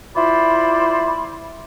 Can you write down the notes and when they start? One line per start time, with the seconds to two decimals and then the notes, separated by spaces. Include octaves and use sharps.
0.16 E4 F4 C5 D5 B5